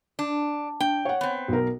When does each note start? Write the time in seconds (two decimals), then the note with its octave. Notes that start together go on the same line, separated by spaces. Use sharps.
0.19 D4
0.80 D4 G5
1.05 C#5 F#5
1.21 B3 C4
1.48 B1 A#4